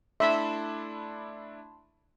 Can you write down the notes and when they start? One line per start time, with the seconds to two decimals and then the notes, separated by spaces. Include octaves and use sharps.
0.20 A3 D4 E4 E5 A5 B5 C6